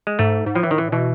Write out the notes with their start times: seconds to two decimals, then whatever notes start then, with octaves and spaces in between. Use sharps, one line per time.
0.07 G#3
0.19 G#2 A3
0.46 G#2
0.55 A2 F3
0.63 E3
0.71 D#3
0.78 E3
0.92 B2 E3